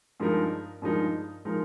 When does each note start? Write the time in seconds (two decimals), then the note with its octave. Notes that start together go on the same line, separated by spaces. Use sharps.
0.20 G2 F3 G#3 D#4 A#4
0.82 G2 F3 G#3 D#4 A#4
1.45 F3 G#3 D#4 A#4